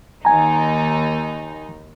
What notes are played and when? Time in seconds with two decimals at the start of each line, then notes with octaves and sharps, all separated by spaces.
0.25 D#2 D#4 G#5 A#5